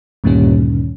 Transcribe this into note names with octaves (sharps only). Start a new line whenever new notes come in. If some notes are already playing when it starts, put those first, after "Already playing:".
D2 G2 A#2 D#3 G3 C#4